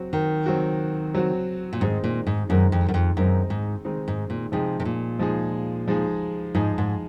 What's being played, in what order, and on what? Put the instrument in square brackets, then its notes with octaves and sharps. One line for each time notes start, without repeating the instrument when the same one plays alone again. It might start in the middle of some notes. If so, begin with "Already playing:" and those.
Already playing: [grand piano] F#3 C4 F#4
[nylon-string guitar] D#3
[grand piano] F#3 C4 F#4
F#3 C4 F#4
[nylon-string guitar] A#2
[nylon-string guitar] G#2 [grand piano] D#3 G#3 C4 D#4
[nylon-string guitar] A#2
G#2
[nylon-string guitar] F#2 [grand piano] D#3 G#3 C4 D#4
[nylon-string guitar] F2
F#2
F2
[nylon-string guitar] F#2 [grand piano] D#3 G#3 C4 D#4
[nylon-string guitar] G#2
[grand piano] D#3 G#3 C4 D#4
[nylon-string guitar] G#2
A#2
[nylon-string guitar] C3 [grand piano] F3 G#3 D#4 G#4
[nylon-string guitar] C3
A#2
[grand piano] F3 G#3 D#4 G#4
F3 G#3 D#4 G#4
[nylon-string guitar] G#2 [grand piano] F3 G#3 D#4 G#4
[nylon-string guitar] G#2